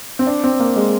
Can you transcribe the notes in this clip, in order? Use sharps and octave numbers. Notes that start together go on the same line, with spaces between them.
C4
D4
C4
A#3
G#3